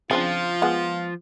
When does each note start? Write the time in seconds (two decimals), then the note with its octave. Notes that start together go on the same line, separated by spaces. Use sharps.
0.11 C#3 F3 C4 D4 F4
0.62 G#3 B3 F#5